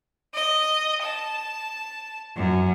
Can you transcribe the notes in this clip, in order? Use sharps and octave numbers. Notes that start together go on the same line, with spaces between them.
D#5
A5
F#2